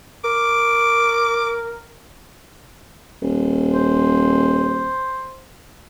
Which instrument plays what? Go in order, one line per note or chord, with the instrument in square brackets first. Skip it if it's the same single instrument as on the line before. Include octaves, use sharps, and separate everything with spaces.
[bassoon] A#4 [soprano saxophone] D6
[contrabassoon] D#1
[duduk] C5